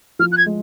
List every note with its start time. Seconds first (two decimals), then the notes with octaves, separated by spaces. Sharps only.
0.19 F3 F6
0.32 F#6
0.37 G#6
0.46 G#3